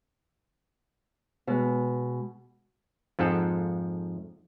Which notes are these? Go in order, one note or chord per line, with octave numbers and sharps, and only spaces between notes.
B2 G#3
F2 G#2 F3 A4 F#5